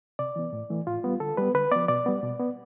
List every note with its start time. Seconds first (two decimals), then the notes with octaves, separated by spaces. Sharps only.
0.19 C3 D5
0.36 E3 B3
0.53 A2
0.70 E3 A3
0.87 A2 F4
1.04 G3 B3
1.20 D3 A4
1.37 G3 B3 B4
1.55 D3 B4
1.71 F3 B3 D5
1.88 B2 D5
2.06 G3 B3
2.23 B2
2.40 B3